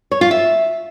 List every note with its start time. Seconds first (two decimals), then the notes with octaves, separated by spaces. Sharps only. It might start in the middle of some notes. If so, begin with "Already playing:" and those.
0.12 C#5
0.21 F4
0.31 E5